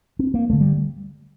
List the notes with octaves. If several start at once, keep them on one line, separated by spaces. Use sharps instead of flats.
C4
A#3
G2 D3 A3
G3